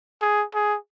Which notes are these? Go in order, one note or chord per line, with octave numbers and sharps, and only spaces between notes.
G#4
G#4